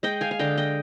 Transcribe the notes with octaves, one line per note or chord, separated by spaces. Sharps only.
G#3 D#5 G5
F5 G#5
F5
D3 D#5 G5
D#5 G5